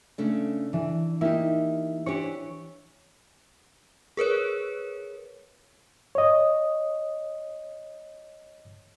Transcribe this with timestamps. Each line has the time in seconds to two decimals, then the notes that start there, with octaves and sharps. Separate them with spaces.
0.18 C#3 A3 D4
0.73 E3 D4
1.21 A#3 D#4 E4 G4
2.06 E3 D4 G4 C#5
4.17 G#4 A#4 B4 C#5
6.15 C#5 D#5